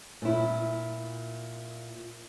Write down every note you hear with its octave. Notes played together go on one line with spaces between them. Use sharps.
A#2 E4